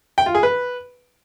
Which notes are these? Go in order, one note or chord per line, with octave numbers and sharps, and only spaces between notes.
G5
F4
G#4
B4